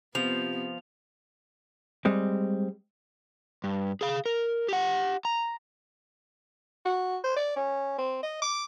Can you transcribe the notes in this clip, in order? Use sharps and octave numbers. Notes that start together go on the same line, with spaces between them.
C3 F3 B3 F7
G3 G#3 C4
G2
G#4 F5
A#4
G4 F#5
A#5
F#4
C5
D5
C#4
C4
D#5
D6